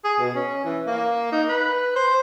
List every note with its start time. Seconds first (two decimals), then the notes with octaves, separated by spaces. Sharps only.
0.04 G#4
0.19 B2
0.35 C#4
0.64 E3
0.87 A#3
1.32 D#4
1.49 B4
1.96 C5